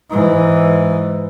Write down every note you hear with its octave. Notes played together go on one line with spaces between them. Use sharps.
G#2 E3